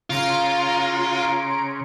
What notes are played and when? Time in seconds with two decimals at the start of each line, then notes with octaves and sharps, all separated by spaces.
0.10 C#3 F4 A#5 C6 D7